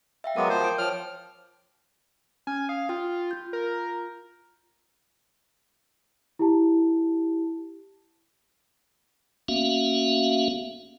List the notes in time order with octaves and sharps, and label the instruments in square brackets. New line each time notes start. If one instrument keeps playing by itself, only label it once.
[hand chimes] E5 F5 G5
[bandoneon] F#3 G#3 B3 [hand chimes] A#4 D6 D#6
[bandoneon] F3 C5
[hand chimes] G5 G6 D7
[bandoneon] F3 F6 [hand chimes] C#5
[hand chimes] C#4 F6 [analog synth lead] G#5
[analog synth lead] F5 [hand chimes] D#6
[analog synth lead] F4 [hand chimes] G5
[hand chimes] F4 G6
[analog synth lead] A#4
[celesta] E4 G4 A5
[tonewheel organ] A#3 B3 C#4 F#4 E5 F5